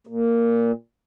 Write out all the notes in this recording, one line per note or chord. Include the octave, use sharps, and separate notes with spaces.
A#2